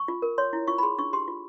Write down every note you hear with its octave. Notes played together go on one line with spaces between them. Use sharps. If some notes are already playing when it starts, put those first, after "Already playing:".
Already playing: C#6
F4
A#4
C#5 C6
E4
F4 C#6
B5
G#4 C6
D4 C#6
G4 C6
F4